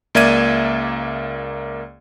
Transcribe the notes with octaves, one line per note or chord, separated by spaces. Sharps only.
C#2 A#3 D5 E5 G#6 D#7